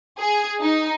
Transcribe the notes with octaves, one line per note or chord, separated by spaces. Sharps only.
G#4
D#4